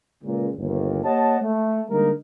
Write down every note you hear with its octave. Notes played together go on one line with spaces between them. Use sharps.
C#2 A#2
G1 D#2
A#3 G4 C#5 D#5 F#5 A5
A3
D3 G3 G#3 A#3 D#4 A#4